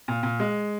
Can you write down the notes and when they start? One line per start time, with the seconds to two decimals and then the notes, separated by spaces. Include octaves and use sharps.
0.08 A#2
0.23 A#2
0.40 G#3